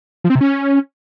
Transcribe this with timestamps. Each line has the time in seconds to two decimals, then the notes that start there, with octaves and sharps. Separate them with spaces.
0.24 F3
0.30 C4
0.35 C3
0.41 C#4